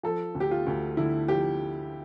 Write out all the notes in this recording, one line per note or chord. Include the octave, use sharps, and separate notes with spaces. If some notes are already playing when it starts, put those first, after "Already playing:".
F3 A4
D2
G4
F4
D2
D3 E4
F3 G4